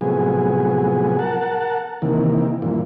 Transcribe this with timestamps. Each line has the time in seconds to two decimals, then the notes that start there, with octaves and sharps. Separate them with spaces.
0.01 A2 C3 F3 F#3 B3 G#4
1.19 A#4 F#5 A5
2.02 C3 D#3 E3 A#3
2.62 G2 A#2 E3 F3